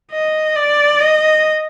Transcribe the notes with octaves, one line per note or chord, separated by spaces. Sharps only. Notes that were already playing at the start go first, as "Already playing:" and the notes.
D#5
D5
D#5